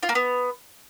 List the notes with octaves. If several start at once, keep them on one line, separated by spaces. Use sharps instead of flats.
F4
A#3
B3